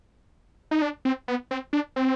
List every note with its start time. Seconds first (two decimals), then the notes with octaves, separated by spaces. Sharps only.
0.71 D#4
0.82 D4
1.05 C4
1.28 B3
1.51 C4
1.73 D4
1.96 C4